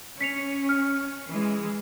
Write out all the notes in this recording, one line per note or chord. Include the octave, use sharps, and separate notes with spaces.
C#4 B6 C#7 F7
F6
E3 G#3